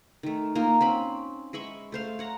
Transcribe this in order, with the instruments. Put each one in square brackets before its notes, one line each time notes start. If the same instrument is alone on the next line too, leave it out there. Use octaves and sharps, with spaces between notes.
[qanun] D#3 A3
A#3 D#4 F4
C4 C#4 B5
G#3 E5 B5 C#6
A3 C5 F5
C#5 F#5 A#5